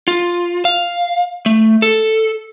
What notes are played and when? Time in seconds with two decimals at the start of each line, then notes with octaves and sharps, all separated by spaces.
0.08 F4
0.65 F5
1.46 A3
1.82 A4